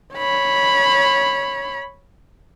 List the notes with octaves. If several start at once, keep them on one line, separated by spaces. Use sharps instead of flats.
C#5 B5